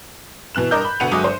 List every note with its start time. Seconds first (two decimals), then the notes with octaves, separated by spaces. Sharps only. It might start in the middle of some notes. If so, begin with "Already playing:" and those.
0.55 B2 E3 F#6 E7
0.71 G2 A#4 D#5 A#5 D6 G6
0.85 B5
1.00 D2 B2 F#5 C#7 D#7 F7
1.11 G1 F#3 G#3 F#4 D6 D#6
1.24 C5